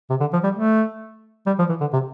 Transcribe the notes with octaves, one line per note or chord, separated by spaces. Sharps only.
C3
D3
F3
G3
A3
G3
F3
E3
D3
C3